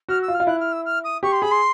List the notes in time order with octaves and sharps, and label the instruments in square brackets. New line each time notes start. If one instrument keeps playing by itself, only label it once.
[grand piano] F#4 [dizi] F6
[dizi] E6
[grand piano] F4
[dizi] F6
[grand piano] F4
[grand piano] E4 [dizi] F#6
[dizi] F6
E6
F6
D#6
[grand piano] G4 [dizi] C#6
[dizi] C6
[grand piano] G#4 [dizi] B5
[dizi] C6